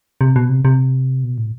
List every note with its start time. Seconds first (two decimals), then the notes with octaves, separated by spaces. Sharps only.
0.21 C3
0.36 B2
0.49 C3
0.65 C3
1.24 B2
1.38 A2